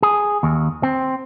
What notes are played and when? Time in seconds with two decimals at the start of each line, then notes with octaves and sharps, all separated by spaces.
0.03 G#4
0.43 D#2
0.83 C4